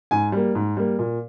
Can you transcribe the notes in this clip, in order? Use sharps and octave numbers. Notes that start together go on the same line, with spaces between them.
G#2 G#5
G3 A#3
G#2
G3 A#3
A#2